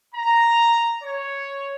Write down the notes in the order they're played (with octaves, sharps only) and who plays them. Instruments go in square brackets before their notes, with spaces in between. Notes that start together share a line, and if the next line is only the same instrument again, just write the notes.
[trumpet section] A#5
C#5